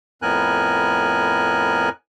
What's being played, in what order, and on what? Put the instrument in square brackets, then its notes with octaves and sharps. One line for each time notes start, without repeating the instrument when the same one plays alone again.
[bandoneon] F2 A2 B3 A#4 G#5 F#6